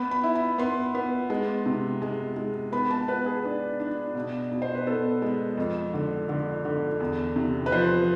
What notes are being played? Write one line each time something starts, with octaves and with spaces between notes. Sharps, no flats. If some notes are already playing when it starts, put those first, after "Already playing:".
Already playing: B3 B5
B5
E4
B5
B3 C6
B3
G#3
C3
G#3
G#3
B3 B5
A5
B3 B4
G#4
D4
D4
B2
B2
C5
B4
B3 A4
G#3
F2
D3
D3
D3
E2
C3
B4
F3 C5